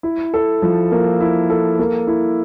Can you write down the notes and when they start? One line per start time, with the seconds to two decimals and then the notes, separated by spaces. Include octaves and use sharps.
0.03 E4
0.34 A4
0.62 F3
0.92 A#3
1.20 E4
1.50 A4
1.79 A#3
2.07 E4